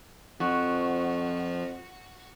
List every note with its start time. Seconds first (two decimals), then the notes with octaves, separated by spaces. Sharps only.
0.40 F2 F3 F#4